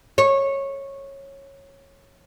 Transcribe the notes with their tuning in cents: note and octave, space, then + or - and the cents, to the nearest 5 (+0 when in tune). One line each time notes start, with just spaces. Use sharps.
C#5 -15